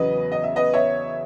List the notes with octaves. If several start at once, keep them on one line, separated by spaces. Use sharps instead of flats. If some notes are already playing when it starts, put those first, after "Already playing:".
Already playing: E2 C#3 F#3 B3 B4 D#5
D#5
E5
B4 D#5
C#5 E5